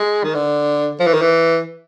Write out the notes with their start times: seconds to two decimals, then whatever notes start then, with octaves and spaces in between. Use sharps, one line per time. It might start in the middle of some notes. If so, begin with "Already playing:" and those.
Already playing: G#3
0.24 D#3
0.35 D3
1.00 F3
1.07 E3
1.14 D#3
1.22 E3